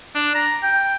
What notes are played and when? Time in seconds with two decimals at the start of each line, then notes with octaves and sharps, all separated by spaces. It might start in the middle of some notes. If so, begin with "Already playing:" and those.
0.15 D4
0.35 A#5
0.63 G5